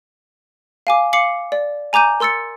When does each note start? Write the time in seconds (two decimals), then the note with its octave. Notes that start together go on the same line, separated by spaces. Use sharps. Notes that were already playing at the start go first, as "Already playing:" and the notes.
0.87 F5 G#5 D6
1.13 F5 D6 C7 C#7 F#7
1.52 D5
1.93 G#5 A#5 D6 G6 D#7
2.20 A#4 C6 E6 A6 C#7